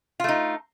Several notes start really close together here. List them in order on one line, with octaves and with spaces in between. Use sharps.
F4 A3 D#4